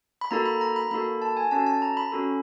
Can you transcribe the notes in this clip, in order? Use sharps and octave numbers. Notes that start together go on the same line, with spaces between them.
B5
A#3 D#4 F#4 A4 A#5
B5
A#5
B5
A#3 D#4 F#4 A4 B5
A5
G#5
C#4 F#4 A4 A5
A5
A#5
B5
C#4 F#4 A4